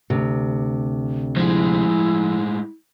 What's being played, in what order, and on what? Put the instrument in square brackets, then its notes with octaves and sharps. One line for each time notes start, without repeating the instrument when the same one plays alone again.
[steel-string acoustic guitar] D2 C3
[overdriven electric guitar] A2 G#3 [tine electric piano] F3 [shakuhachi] E4